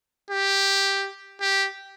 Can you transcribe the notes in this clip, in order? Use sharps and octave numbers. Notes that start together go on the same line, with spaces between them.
G4
G4